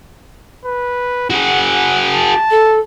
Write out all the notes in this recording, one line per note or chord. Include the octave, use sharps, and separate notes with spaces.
B4
F#4 G#4 F#5
A5
A4